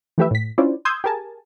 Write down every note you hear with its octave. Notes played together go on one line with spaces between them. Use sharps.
E3 F3 A3 G4 B4 E5
A2 B6
C#4 D4 E4 F4 C5 D5
C6 D#6 E6 G6 G#6
G4 G#4 A#4 G#5 A5